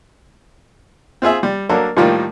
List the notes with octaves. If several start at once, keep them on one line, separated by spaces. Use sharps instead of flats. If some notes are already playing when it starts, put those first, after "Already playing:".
C4 F4 G#4 E5
G3
F#3 A#3 D4 A4
A2 D#3 F3 G3 A#3 F4